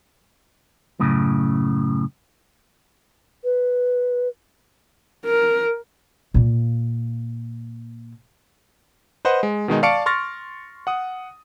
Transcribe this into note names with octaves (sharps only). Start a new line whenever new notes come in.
F#2 A2 C#3
B4
A#4
A#2 A#3
B4 C5 D#5 F#5
G#3
B2 D#3 G#3 D#4
D5 F5 A5 C#6 C#7 D7
C6 C#6 F6 A6 A#6
F#5 D#6